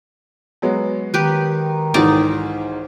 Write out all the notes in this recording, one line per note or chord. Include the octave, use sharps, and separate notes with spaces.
F#3 G#3 B3
D#3 G4 B4
B1 G#2 E3 D#4 D5 D6